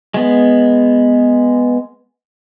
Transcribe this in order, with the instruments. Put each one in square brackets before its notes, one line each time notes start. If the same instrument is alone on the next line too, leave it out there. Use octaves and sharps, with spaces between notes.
[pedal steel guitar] G#3 B3